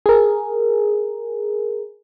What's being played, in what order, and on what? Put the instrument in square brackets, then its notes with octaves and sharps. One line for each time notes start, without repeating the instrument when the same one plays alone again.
[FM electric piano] G#4 A#4